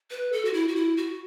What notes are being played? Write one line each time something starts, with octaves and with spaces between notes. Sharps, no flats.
B4
A4
F#4
E4
F#4
E4
F#4